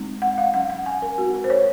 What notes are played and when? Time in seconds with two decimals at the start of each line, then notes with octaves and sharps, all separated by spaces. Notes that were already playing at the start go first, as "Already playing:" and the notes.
Already playing: G#3 C4 D#4
0.22 F#5
0.38 F5
0.53 F#3 C#4 F#5
0.70 F#5
0.86 G#5
1.02 A#4
1.18 G#3 C4 D#4 F#4
1.34 A#4
1.44 C5
1.50 C#5